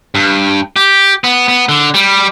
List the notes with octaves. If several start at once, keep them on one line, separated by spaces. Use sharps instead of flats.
G2
G4
B3
B3
D3
G3